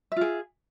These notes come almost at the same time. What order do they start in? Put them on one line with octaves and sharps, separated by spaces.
E5 F4 G#4